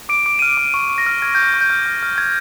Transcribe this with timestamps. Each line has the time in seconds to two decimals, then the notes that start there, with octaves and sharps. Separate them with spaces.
0.09 D6 D7
0.26 D6 D7
0.39 F6 D#7
0.49 D7
0.57 D6
0.74 C#6 D#7
0.89 C#6
0.98 A#6
1.06 F6
1.22 F6 G#6
1.35 F6 G6
1.54 C#6
1.61 G6
1.70 F6
1.86 F6
2.03 F6
2.18 F6 G#6